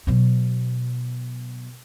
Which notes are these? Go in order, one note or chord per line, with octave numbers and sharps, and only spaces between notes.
B2 F#3